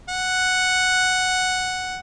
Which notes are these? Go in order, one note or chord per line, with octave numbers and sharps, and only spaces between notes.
F#5